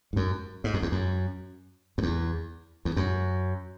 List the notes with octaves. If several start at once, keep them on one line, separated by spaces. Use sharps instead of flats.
G#2
F#2
G#2
F#2
E2
F#2
F#2
E2
E2
F#2